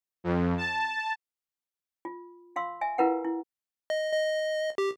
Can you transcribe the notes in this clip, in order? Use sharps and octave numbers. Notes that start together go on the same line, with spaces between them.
F2
A5
F4
F4 F5 C6 E6
E5 G#5
E4 F4 A#4 B4 F5 F#5
E4
D#5
D#5
G4